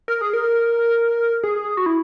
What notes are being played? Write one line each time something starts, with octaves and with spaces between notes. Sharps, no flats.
A#4
G#4
A#4
G#4
F#4
E4